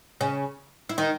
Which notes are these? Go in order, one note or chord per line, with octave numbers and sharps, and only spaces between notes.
C#3 C#4
E4
D#3 D#4